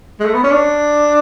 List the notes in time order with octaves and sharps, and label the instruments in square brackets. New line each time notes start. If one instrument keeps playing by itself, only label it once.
[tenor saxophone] G#3
A3
B3
C#4
D4